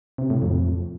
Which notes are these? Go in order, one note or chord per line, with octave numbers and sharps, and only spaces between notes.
C3
A2
F2